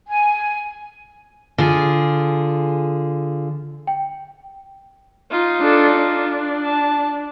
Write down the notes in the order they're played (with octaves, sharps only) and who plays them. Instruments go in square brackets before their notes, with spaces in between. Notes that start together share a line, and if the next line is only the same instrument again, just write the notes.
[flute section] G#5
[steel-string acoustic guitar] D3 F4 G#4
[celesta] G5
[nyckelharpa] D#4 F4
[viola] D4 A4
D4
[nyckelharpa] A5